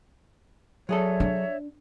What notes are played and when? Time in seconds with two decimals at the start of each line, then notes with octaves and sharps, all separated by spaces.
0.89 F#3 G#4 A4 C#5 D5 E5
1.20 D4